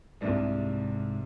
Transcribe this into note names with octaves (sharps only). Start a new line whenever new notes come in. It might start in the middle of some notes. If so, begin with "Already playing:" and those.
C2 G#2 C3 G3 D4